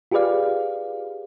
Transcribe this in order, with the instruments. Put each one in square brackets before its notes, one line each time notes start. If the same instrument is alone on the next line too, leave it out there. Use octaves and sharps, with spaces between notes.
[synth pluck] F4 G4 G#4 B4 D5 F5